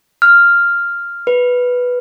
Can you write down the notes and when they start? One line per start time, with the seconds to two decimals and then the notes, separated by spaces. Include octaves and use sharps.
0.22 F6
1.27 B4